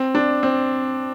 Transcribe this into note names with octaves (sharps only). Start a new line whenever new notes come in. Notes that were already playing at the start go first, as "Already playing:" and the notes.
Already playing: C4
D4
C4